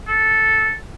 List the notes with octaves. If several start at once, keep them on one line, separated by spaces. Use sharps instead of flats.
A4